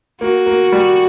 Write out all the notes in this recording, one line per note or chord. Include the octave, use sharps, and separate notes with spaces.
A#3 F#4
A#3
G3